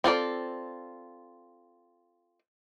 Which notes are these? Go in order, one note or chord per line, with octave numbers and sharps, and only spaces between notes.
C4 F4 A4 D5